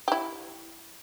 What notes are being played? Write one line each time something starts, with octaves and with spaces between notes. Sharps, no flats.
E4 G4